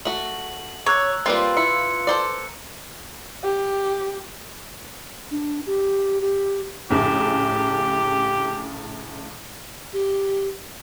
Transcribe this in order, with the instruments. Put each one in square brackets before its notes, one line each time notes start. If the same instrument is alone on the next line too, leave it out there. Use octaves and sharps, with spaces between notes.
[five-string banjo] A3 F#4 [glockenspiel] F#7
[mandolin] C#5 [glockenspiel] A#5 E6 F#6
[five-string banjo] G3 A#3 C4 [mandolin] F4 [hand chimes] B4 C6
[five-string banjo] E4 [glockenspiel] C#7
[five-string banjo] A4 C5 D5
[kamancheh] G4
[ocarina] D4
G4
G4
[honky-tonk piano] A#1 A2 C#3 [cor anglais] G4
[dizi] G4